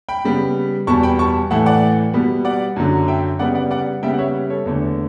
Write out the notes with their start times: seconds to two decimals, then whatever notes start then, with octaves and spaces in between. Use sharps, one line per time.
0.09 G5 B5
0.25 C#3 G3 B3
0.87 E2 B2 G3 A5 C#6
1.03 G5 B5
1.19 A5 C#6
1.50 A2 E3 A3 F#5 A5
1.66 D5 F#5
2.14 B2 G3 B3
2.45 D5 F#5
2.76 F#2 D3 F#3
3.08 E5 G5
3.39 C#3 G3 B3 D5 F#5
3.55 D5 F#5
3.71 D5 F#5
4.02 C#3 G3 B3 E5 G5
4.14 F#5
4.18 C#5 E5
4.50 A4 C#5
4.65 E2 D3 A3